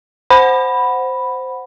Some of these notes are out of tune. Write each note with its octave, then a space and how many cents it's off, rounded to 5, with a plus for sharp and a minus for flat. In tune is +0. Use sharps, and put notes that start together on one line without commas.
C5 -5 F#5 +0 B5 +0